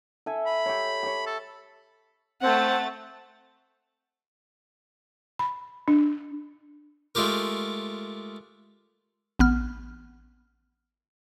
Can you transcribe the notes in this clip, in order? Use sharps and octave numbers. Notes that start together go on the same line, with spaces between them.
A4 E5 G#5
B5
G4 C#5
G4 C#5
A4
A3 C4 F#5 A6
B5
D4
G#3 A3 F4 G4 A#4
A1 B3 F6